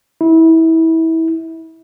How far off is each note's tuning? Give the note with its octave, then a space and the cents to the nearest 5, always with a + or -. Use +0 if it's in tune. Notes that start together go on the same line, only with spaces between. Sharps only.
E4 -25